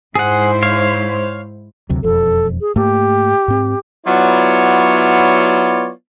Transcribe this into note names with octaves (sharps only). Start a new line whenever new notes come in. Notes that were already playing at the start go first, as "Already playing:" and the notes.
G#2 E4 G#4 C5 F#5
C#5 F5
D2 C3 F#3
E1 F2 A4
G#4
G#2 A3 A#3 G4
G#2 C4
F#3 B3 E4 F4 C#5 D5